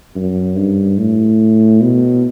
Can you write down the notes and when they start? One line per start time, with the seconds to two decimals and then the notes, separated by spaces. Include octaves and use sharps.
0.15 F#2
0.57 G2
0.98 A2
1.81 B2